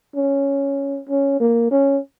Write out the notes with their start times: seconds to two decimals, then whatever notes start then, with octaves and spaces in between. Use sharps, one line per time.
0.16 C#4
1.09 C#4
1.40 A#3
1.71 C#4